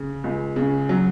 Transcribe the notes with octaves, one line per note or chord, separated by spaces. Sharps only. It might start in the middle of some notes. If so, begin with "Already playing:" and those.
Already playing: C#3
C#2
C#3
F#3